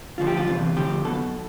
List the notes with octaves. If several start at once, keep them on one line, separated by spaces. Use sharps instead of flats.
D2 D3 F3 F4
G4
F4
E2 C3 E3
D2 D3 F3 G4
B1 B2 A4